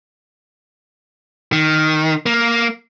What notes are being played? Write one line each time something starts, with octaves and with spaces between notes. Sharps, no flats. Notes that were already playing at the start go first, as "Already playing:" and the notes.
D#3
A#3